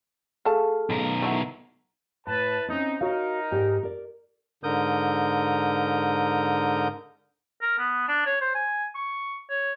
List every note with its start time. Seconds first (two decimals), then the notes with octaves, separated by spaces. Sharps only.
0.45 A3 G#4 A4 F5 A5
0.90 B1 A#4
1.22 A3 E4 F#4
2.27 A2 B4 A5
2.68 C4 C#4 D#4
3.01 D#4 F#4 A#4 C#5 F5
3.51 G#2 G4 D5
3.83 A#4 D5
4.64 G#2 D3 A#4 D#6 G6
7.62 A#4
7.79 B3
8.08 D4
8.26 C#5
8.41 C5
8.55 G#5
8.95 C#6
9.50 C#5